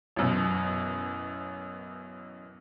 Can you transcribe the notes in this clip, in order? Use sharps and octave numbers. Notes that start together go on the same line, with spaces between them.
A1 F#2 B2